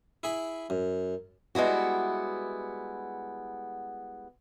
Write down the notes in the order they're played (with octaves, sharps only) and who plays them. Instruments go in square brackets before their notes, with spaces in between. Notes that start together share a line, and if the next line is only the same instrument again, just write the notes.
[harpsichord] E4 G#4 B5
F#2
[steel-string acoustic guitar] G3 G#3 B3 E4 F#4